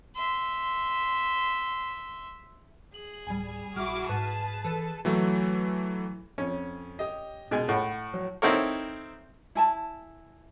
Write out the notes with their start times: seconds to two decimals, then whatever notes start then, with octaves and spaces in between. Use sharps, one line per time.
0.15 E5 C6
2.94 G#4 F#7
3.27 D1 G3 G#5
3.76 A#1 G3 E4 F#4 D6 F6
4.09 G#2 B4 A5
4.65 E3 A4 B4
5.05 E3 F#3 A3
6.38 F2 C#4
6.99 G4 D#5
7.51 B2 G#3 G#5
7.69 A2 F#5 B5
8.14 F#3
8.42 C4 D#4 E4 A4 A#4 C#5
9.55 E4 G#5 A5